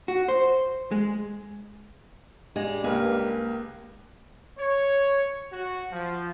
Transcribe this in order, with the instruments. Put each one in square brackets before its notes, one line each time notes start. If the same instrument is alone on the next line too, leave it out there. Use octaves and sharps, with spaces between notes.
[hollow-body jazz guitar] F#4
C5
G#3
[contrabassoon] G2 [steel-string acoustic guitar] G3 G#3
[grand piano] C#2 G#5 [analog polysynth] A#3 A#4 [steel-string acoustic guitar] B4
[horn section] C#5
F#4
F3